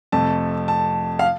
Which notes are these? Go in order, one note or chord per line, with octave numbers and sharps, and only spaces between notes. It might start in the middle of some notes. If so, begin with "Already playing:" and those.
F2 C3 F3 A3 A5
A5
F5